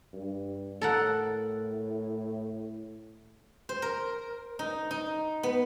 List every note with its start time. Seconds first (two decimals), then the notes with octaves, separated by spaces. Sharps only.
0.13 G2
0.81 A2 A4 A#4 F#5
3.69 C5
3.82 A#4
4.59 D#4
4.91 D#4
5.43 B3